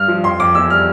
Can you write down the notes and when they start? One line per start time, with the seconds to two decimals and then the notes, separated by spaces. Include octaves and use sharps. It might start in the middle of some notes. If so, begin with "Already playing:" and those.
Already playing: G2 F6
0.08 F3
0.24 F2 C6
0.40 F2 D6
0.55 E2 E6
0.70 G3 F6